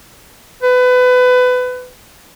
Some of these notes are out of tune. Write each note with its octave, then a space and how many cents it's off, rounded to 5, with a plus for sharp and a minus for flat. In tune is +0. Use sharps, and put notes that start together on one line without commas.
B4 +25